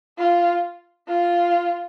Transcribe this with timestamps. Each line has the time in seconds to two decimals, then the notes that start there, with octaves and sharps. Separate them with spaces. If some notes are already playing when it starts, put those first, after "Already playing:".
0.18 F4
1.08 F4